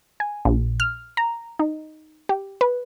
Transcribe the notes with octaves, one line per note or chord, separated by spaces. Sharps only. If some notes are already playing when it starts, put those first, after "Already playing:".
G#5
A#1
F6
A#5
D#4
G4
B4